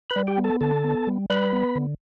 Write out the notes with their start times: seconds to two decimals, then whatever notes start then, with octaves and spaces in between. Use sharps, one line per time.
0.10 B4 B5
0.16 G3
0.27 G4 G5
0.38 B3
0.44 A4 A5
0.61 D3 A4 A5
0.84 B3
1.07 G3
1.30 G3 B4 B5
1.53 B3
1.76 D3